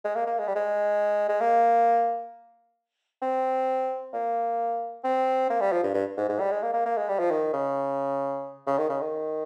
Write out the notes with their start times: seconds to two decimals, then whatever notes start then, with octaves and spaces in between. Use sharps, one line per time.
0.05 G#3
0.16 A#3
0.27 A#3
0.39 G#3
0.47 G3
0.55 G#3
1.29 G#3
1.41 A#3
3.22 C4
4.14 A#3
5.04 C4
5.50 A#3
5.61 G3
5.72 F3
5.84 G2
5.94 G2
6.17 G#2
6.29 G#2
6.40 G3
6.51 G#3
6.63 A#3
6.74 A#3
6.86 A#3
6.97 G#3
7.09 G3
7.20 F3
7.31 D#3
7.53 C#3
8.67 C#3
8.78 D#3
8.90 C#3
9.01 D#3